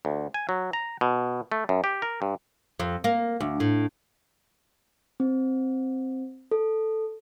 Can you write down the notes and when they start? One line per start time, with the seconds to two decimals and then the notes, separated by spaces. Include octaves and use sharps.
0.05 D2
0.34 G#5
0.49 F#3
0.73 A#5
1.01 B2
1.52 A3
1.69 F#2
1.84 G4
2.02 A#4
2.22 G2
2.80 F2
3.04 A#3
3.40 D2
3.60 A2
5.20 C4
6.51 A4